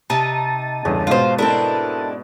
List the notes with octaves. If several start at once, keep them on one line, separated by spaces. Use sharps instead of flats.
C3 D#4 A5 A6 D#7
G1 E2 C#3
G#2 B2 F4 C5
C4 D4 E4 A4 A#4